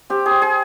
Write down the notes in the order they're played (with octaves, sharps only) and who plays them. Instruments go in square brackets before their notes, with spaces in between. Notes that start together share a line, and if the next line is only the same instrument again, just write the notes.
[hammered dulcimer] C4 G4
G#4
C4
G#4